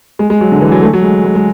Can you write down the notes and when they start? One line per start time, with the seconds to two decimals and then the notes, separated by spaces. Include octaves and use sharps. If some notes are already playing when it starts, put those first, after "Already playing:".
0.19 G#3
0.30 G#3
0.41 F#3
0.51 D3
0.61 E3
0.72 F#3
0.83 A3
0.93 F#3
1.04 G#3
1.24 G#3
1.35 G#3